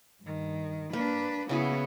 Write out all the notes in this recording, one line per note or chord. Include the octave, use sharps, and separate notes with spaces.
G2 D#3
A#3 D4 B4
C#3 B3 E4 F#4 G#4